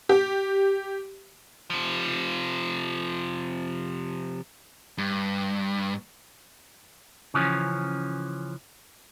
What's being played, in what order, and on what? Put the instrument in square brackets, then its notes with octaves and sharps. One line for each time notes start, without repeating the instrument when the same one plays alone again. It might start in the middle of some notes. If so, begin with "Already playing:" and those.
[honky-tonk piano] G4
[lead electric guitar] C3 F3
G2
[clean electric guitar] C#3 E3 F3 C#4